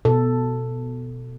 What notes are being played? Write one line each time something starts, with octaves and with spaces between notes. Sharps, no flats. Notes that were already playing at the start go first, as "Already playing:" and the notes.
B2 A4